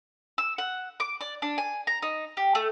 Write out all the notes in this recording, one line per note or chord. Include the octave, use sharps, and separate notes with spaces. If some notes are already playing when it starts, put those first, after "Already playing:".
E6
F#5
D6
D5
D4
G#5
A#5
D#4
G4
A3